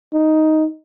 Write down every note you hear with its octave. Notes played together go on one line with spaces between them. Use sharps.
D#4